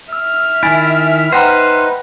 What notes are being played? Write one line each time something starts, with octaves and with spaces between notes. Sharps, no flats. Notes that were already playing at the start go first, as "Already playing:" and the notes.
E5 E6 F6
D#3 E4 G#5 A6 D7
D#4 B4 C5 F#5 G5 A#5